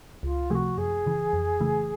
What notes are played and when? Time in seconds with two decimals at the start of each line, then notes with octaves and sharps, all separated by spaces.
0.23 C#2 F4
0.50 C3 F3 A3 F#4 G#4
0.78 F#2 G#4
1.06 C#3 E3
1.33 F2
1.60 C#3 E3 A3